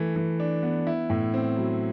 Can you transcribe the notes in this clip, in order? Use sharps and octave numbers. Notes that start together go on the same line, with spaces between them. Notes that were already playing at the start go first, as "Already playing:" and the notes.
Already playing: E3 A3
E3
D4
B3
E4
A2
C4
F#3